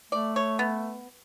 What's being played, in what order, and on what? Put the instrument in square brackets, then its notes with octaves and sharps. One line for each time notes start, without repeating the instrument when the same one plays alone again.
[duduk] A3 [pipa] D5
[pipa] C#5
B3